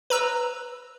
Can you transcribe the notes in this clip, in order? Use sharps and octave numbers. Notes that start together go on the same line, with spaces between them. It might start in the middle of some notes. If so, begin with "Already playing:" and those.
B4 A#5 E6